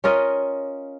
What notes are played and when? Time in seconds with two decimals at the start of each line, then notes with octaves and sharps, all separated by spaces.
0.04 C#4 F4 A#4 D#5